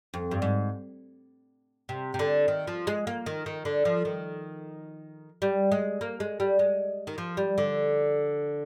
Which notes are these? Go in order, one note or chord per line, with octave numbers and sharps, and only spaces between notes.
F2
G2
G#2
C3
C3
D3
D#3
F3
G#3
A#3
D#3
D#3
D3
F3
D#3
G3
G#3
A#3
G#3
G3
G#3
D#3
F3
G3
D3